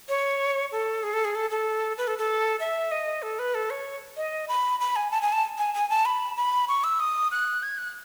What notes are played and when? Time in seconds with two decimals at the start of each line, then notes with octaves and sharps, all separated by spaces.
0.09 C#5
0.72 A4
1.03 G#4
1.13 A4
1.24 G#4
1.35 A4
1.50 A4
1.98 B4
2.07 A4
2.18 A4
2.60 E5
2.91 D#5
3.22 A4
3.39 B4
3.55 A4
3.70 C#5
4.17 D#5
4.49 B5
4.80 B5
4.96 G#5
5.11 A5
5.22 G#5
5.33 A5
5.58 G#5
5.74 G#5
5.90 A5
6.05 B5
6.37 B5
6.68 C#6
6.84 E6
7.00 D#6
7.31 F#6
7.63 G#6
7.78 F#6